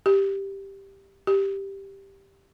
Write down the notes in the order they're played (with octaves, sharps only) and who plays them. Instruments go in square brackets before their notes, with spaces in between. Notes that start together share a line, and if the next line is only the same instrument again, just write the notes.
[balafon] G4
G4